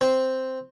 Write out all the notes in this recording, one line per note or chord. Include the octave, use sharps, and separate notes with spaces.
C4